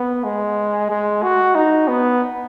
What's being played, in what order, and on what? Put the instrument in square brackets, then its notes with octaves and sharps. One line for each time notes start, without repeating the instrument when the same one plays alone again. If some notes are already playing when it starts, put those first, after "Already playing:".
Already playing: [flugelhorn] B3
G#3
G#3
F#4
D#4
B3